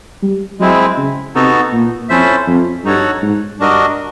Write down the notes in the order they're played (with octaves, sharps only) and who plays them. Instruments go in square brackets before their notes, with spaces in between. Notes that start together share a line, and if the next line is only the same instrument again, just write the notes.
[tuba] G3
[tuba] F#3 [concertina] G#3 C4 E4
[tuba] C#3
[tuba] C3 [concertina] B3 D#4 F#4 A4
[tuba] A#2
[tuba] F2 [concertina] C#4 E4 A4 C5 E5
[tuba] F2
[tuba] G2 [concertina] D#4 F#4 A4 C#5 F#5
[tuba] G#2
[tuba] G2 [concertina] D4 F#4 A#4 D#5